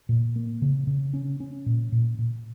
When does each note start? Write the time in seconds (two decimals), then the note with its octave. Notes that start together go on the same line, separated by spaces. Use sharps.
0.09 A#2
0.36 A#3
0.62 C#3
0.87 C#3
1.13 C#4
1.40 C#4
1.66 A#2
1.92 A#2
2.19 A#2